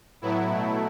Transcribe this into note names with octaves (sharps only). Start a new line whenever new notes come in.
A2 F#3 B3 E4
B2 F#3 A3